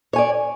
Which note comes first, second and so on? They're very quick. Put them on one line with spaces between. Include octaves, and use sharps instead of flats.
C#5 G#5 D5